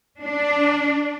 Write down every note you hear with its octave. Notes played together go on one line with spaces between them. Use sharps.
D4